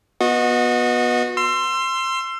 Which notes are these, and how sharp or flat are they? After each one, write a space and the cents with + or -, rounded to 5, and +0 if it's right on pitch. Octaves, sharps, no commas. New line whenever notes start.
B3 -15 F#4 -30 D#5 +0
C6 +5 E6 +35